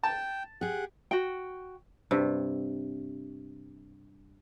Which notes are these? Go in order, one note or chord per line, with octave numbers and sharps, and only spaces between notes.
G5 A5
G4 G#4 F#5
F#4 G5
G2 C3